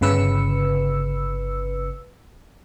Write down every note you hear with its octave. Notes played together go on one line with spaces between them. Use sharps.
G1 C#3 B4 E6 C#7